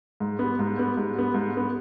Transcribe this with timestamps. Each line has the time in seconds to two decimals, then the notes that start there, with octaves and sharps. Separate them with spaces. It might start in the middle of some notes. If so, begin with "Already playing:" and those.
0.20 G#2
0.39 G3 B3
0.59 G#2
0.77 G3 B3
0.97 G#2
1.16 G3 B3
1.34 G#2
1.54 G3 B3